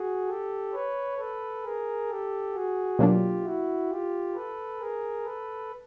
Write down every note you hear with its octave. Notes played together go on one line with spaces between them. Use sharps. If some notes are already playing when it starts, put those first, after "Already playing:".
Already playing: F#4 G#4
G4 A4
B4 C#5
A4 B4
G#4 A#4
G4 A4
F#4 G#4
B2 F#3 A#3 D4 F4 G4
E4 F#4
F4 G4
A4 B4
G#4 A#4
A4 B4